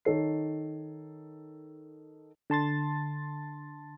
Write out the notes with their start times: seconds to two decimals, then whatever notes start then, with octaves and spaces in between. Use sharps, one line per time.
0.05 D#3 D#4 A4 C#5 C7
2.50 D3 A5 C6 A6